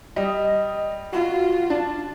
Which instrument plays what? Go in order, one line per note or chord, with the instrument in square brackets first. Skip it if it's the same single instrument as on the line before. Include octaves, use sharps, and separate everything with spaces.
[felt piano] G3 [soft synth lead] D#5
[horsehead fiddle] F4 [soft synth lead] F#4
[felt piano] D4 [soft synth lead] A5